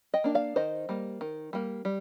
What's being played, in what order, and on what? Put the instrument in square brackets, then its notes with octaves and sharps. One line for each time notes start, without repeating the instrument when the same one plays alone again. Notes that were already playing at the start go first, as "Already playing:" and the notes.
[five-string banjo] D#5 G5
A#3 D4
D5 F5
D#3 C5 D#5
G3 A#3
D#3
G3 A#3
G3